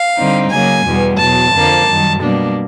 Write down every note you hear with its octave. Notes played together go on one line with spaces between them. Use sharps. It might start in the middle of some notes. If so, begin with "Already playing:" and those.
Already playing: F5
D3 G3 C4 D#4
C#3 F#3 A#3 G#5
E2 B2 G3 B3
E2 B2 F#3 A5
F2 D3 F3 A#3
F#2 D#3 G3
B2 G3 A#3 D4